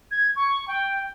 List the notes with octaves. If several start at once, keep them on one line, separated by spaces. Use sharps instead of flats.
G#6
C#6
G5